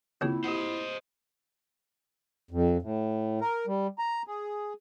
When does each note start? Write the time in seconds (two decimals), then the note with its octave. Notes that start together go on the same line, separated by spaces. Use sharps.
0.21 D#2 C#3 A#3 C4 E4 F4
0.44 G4 C5 D#5 F#5
2.51 F2
2.82 A2
3.41 A#4
3.67 G3
3.99 A#5
4.27 G#4